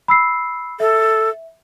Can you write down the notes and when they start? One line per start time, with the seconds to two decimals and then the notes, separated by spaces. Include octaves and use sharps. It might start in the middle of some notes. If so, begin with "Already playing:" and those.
0.08 B5 E6 C7
0.80 A4 E5